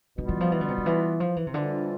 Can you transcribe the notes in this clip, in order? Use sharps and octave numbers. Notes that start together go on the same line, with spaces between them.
B2 D3 G3 B3 F4
E3
F3
E3
D3
C3
D3
E3
F3
E3
C3
F2 D3 E3 G3 D4 F4